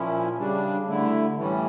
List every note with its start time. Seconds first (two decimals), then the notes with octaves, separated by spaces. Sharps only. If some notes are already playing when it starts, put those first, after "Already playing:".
Already playing: A#2 F3 C#4 E4
0.38 C#3 G3 D4
0.88 D3 A3 E4
1.36 A2 E3 G3 C#4